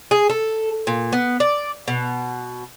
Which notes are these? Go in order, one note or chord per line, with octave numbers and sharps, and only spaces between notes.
G#4
A4
A#2
B3
D5
B2